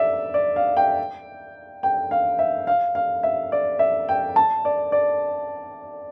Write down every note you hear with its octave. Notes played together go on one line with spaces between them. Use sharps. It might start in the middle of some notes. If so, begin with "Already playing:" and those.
Already playing: D5 E5
D5
F5
G5
G5
F5
E5
F5
F5
E5
D5
E5
G5
A5
D5
D5